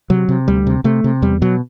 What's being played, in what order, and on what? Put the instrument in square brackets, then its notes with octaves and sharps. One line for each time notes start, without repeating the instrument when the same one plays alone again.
[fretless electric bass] C3 F#3
C3
D2 G3
C3
C3 A3
C3
E2 G3
B2 F#3